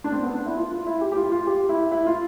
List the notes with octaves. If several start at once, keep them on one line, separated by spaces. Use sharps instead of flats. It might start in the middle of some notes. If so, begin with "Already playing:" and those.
D4
C4
B3
D4
E4
F4
F4
E4
G4
G4
F4
F4
G4
E4
E4
F4